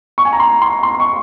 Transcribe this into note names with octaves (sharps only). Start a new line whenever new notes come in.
C#6
G#5
A#5
C6
C6
C6
C6
C#6